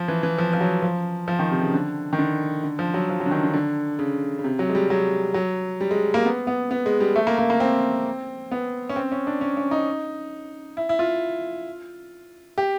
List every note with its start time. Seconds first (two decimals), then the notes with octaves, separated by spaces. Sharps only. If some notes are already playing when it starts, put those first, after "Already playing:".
Already playing: F3
0.08 E3
0.23 E3
0.38 F3
0.53 F3
0.61 F#3
0.82 F3
1.28 F3
1.39 D#3
1.51 C3
1.62 C#3
1.74 D3
2.13 D#3
2.19 D3
2.64 D3
2.79 F3
2.94 F#3
3.09 F3
3.20 F#3
3.26 D3
3.31 D#3
3.43 D3
3.54 D3
3.99 C#3
4.39 C#3
4.44 C3
4.59 F#3
4.70 G#3
4.75 G3
4.90 F#3
5.34 F#3
5.81 G3
5.91 G#3
6.14 A#3
6.25 B3
6.47 B3
6.71 B3
6.86 G#3
7.01 G3
7.16 A3
7.27 A#3
7.38 A#3
7.50 A#3
7.60 C4
8.51 B3
8.89 C#4
8.96 C4
9.12 C#4
9.27 D4
9.41 C#4
9.57 C#4
9.71 D#4
10.77 E4
10.89 E4
10.99 F4
12.58 G4